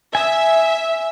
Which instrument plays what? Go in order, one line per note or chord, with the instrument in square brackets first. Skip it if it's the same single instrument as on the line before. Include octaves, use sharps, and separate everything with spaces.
[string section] E5 [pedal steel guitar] G#5 D#6